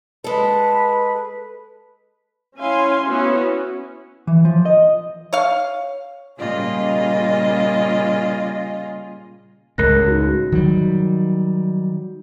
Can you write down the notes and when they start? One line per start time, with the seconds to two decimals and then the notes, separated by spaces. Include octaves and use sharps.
0.24 G#3 A4 B4
2.59 C#4 E4 F5 G#5 C6
3.06 B3 C#4 E4 F#4
4.27 E3
4.45 F3
4.65 D#5
5.33 C#5 F5
6.39 A#2 C#3 G3 F4 G#4 D#5
9.78 C#2 A2 A#4 F#6 A#6
10.07 D#4 F#4
10.52 D#3 F#3 G3